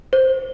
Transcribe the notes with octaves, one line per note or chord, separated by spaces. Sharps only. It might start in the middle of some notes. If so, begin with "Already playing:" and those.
C5